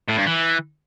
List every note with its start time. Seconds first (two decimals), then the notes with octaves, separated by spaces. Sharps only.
0.09 A2
0.18 G2
0.26 E3